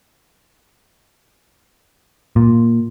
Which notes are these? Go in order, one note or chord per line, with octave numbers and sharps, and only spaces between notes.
A#2